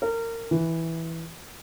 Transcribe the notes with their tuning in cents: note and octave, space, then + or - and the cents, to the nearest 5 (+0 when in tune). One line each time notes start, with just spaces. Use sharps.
A#4 -25
E3 -5